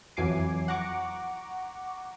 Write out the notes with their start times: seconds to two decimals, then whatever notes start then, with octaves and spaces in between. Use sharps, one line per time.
0.17 F2 E3 F#3 G#5 D6 C7
0.68 F#5 A#5 C#6 D6